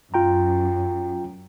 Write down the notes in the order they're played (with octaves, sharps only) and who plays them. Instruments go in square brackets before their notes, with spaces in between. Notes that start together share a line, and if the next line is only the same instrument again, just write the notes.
[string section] F#2 [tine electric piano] F4 G5 A#5